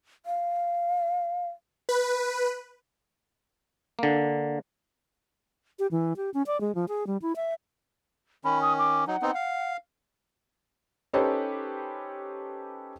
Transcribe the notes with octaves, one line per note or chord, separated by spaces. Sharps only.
F5
B4
D3 A#3
G4
E3
G4
C#4
D5
G#3
F3
G#4
G3
E4
E5
D#3 C#4 B5
D#6
D6
F#3 D#4 F#5
B3 C4 D#4
F5
C#4 D#4 G4 A4 B4 C5